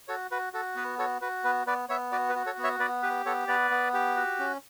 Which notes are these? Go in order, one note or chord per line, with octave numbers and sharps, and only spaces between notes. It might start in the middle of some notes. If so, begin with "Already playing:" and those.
F#4 A4 C#5
F#4 B4
F#4 A4
B3 B4
F#4 A4 C#5
F#4 B4
B3 B4
B3 B4 D5
B3 C#5 E5
F#4 B4 D5
B4
F#4
A4 C#5
B3
C#5 E5
B3 B4 D5
G4 B4
B3 A4 C#5
B3 B4 D5
B3
G4
F#4
C#4